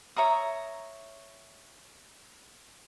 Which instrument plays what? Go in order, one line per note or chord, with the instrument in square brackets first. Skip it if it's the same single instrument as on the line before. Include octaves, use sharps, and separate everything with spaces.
[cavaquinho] C#5 E5 A#5 D#6